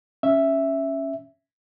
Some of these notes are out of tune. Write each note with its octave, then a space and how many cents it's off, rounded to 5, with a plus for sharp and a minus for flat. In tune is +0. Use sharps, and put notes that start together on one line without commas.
C#4 +0 E5 +0